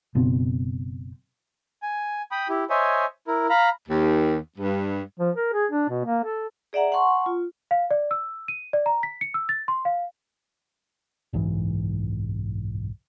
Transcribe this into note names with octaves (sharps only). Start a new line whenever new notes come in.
F#1 B2 C4
G#5
G5 B5 D#6
E4 G4
C5 C#5 D#5 E5 G#5
E4 A#4
F5 A#5 B5
D#2
G2
F3
A#4
G#4
D4
B2
A#3
A4
G#4 D5 E5 F#5 A#5
F#5 A5 C6 C#6
F4
F5
D5
E6
D#7
D5
A#5
B6
C#7
E6
A6
C6
F5
F#1 B1 G#2 E3